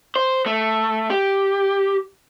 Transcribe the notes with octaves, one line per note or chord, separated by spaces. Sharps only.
C5
A3
G4